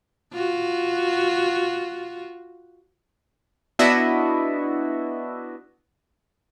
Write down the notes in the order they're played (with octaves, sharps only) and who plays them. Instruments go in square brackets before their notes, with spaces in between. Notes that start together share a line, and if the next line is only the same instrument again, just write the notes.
[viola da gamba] F4 F#4
[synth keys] B3 D4 E4 F#4 D#5 E5